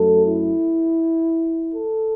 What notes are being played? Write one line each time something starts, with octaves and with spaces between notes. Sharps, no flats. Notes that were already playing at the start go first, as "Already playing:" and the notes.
Already playing: F#2 F#3 A3 A4
E4
A4